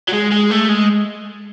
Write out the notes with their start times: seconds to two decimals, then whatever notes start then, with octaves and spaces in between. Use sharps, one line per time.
0.08 F#3
0.13 G#3
0.31 G#3
0.50 A3
0.68 G#3